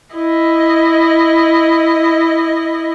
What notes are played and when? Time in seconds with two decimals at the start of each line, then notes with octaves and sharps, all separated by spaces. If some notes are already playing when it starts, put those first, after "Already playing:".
0.16 E4 D#5